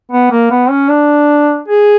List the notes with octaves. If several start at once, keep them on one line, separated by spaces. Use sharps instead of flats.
B3
A#3
B3
C#4
D4
G#4